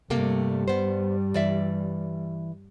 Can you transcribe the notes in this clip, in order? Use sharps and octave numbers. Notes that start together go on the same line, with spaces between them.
G2 C3 G3 A3 A#3
B3 C5
E3 D5 E5